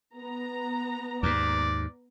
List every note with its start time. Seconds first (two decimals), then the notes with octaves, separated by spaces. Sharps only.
0.16 B3 A#5
1.23 D#2 G#2 D5